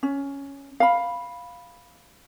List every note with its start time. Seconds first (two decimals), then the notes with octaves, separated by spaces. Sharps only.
0.03 C#4
0.80 F5 B5